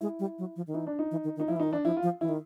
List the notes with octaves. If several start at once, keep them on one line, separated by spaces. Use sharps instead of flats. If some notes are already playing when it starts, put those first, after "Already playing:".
G#3 E4
G3
F#3
F3
D#3
E3 D#4
D4
D#4
E3
D#3
D#3
D#4
F3 E4
E3
D#3 D#4
E3 D4
F3 E4
F4
F3
E3 E4
D#3